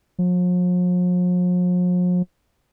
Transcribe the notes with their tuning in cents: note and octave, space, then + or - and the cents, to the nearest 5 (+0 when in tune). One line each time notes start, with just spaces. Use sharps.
F3 +45